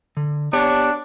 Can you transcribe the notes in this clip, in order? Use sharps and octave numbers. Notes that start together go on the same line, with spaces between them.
D3
B3 D4 G4 C#5